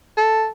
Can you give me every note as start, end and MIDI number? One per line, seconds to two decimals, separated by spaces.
0.18 0.47 69